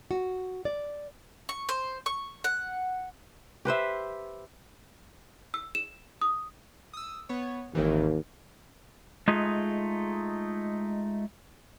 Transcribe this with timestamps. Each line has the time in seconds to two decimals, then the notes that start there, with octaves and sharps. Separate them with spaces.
0.11 F#4
0.65 D5
1.49 C#6
1.69 C5
2.06 C#6
2.44 F#5
3.65 G4 B4 C5 E5
5.54 E6
5.75 E7
6.21 D#6
6.93 D#6 E6
7.29 B3 C#5
7.75 G#1 D#2 D#3 E3
9.28 G#3 A3 D#4 F4 G#4